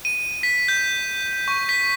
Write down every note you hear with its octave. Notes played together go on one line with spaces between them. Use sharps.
D#7
B6
G6
C#6
B6